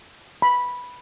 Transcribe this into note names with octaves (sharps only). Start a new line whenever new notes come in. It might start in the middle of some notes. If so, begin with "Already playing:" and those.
B5